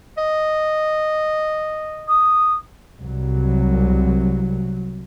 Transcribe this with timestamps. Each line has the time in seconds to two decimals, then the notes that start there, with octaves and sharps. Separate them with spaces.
0.18 D#5
2.08 D#6
3.02 C2 F#3